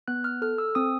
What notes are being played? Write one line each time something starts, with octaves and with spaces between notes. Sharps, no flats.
B3 F#6
F6
A4 F6
E6
C4 D#6